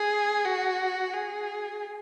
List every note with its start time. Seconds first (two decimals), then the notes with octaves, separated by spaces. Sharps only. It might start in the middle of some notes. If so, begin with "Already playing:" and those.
Already playing: G#4
0.45 F#4
1.13 G#4